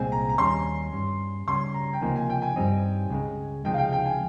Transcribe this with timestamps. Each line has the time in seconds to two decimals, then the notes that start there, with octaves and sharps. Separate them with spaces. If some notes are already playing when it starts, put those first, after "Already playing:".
Already playing: C2 A#2 G#3 C4 G#5
0.12 A#5
0.29 A#5
0.38 D#2 D#3 G3 C#4 C6
0.93 G2 G3 C#4
1.47 C#2 C#3 G3 C#4 C6
1.74 A#5
1.93 G5
2.01 C#2 C3 F3 A#3 D#4 G#5
2.16 G#5
2.30 G5
2.42 G#5
2.56 G2 G3 C4 D#4
3.10 C#2 C#3 G#3
3.65 C#2 C3 F3 G#3 D#4 G5
3.74 F5
3.78 G5
3.93 G5
4.06 G#5